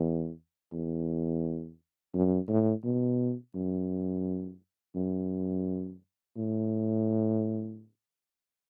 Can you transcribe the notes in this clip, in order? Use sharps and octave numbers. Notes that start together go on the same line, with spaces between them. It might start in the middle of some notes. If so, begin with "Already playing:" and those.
Already playing: E2
E2
F#2
A2
B2
F#2
F#2
A2